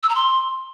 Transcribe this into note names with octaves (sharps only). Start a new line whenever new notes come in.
E6
A#5
C6